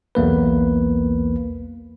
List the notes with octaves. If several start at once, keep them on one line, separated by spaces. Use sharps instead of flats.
B1 E2 A#3 B4